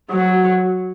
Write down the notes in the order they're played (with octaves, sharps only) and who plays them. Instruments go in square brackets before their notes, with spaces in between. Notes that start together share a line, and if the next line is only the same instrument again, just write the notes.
[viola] F#3